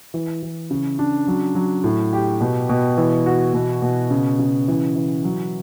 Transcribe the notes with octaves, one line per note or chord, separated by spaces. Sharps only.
E3
E3
C#3
D4
F#3
F#3
A2
G4
B2
B2
E3
F#4
B2
B2
C#3
C#3
E3
E3
F#3